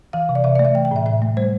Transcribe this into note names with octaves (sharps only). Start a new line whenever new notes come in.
E3 F5
C3
D5
C3 E5
A3 D5
E5
E3 G5
G5
A2 E5
A2 E5
A3
G3 C5